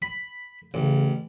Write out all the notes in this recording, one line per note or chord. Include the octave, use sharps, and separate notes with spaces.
B5
A1 C#3